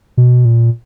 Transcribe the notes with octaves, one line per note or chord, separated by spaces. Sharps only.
B2
A#2